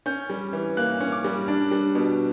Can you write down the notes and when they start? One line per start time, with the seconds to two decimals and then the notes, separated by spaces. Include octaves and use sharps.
0.06 C#4 G6
0.30 G3
0.53 E3
0.77 A#3 F#6
1.01 C#4
1.12 D6
1.24 G3
1.48 D4
1.71 G3
1.95 B2